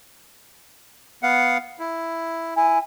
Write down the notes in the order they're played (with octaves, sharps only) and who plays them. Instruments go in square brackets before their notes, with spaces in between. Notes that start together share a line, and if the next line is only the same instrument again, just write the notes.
[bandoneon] B3 F5 F#5
E4
[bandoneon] E4 [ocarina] G#5